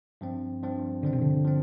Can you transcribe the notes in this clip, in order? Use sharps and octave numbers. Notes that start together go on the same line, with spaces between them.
G2 F3 C4
G2 F3 C4
G2 D3 F3 C4
C3
D3
F3 C4